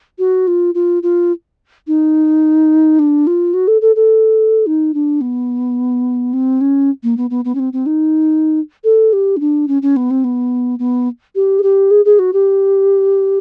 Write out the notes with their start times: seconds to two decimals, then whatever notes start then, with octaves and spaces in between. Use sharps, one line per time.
0.19 F#4
0.47 F4
0.75 F4
1.03 F4
1.87 D#4
2.99 D4
3.27 F4
3.54 F#4
3.68 A4
3.82 A4
3.96 A4
4.67 D#4
4.94 D4
5.21 B3
6.33 C4
6.61 C#4
7.03 A#3
7.17 B3
7.30 B3
7.45 B3
7.55 C#4
7.59 C4
7.73 C4
7.86 D#4
8.84 A4
9.13 G4
9.37 C#4
9.40 D4
9.68 C#4
9.82 C#4
9.96 B3
10.11 C4
10.24 B3
10.79 B3
11.35 G4
11.59 G#4
11.63 G4
11.91 G#4
12.05 G#4
12.19 F#4
12.33 G4